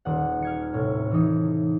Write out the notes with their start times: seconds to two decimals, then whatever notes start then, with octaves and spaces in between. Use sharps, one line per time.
0.05 D#1 F#5
0.42 F6 G#6 C#7
0.74 A2 C3
1.11 E3 D#4